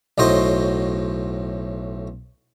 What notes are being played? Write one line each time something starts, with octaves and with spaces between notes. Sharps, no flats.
B1 A2 F#3 C5 D#5 C6